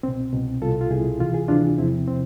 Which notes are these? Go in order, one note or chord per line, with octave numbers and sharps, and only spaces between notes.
C2 B2 C4
C2 B2
C2 B2 F4 A4
F4
C2 B2 E4 G#4
D2 C3 E3 F4
G#4
D2 C3 E3 D4 F4
E2 C3 F3 C4 E4
C3 C4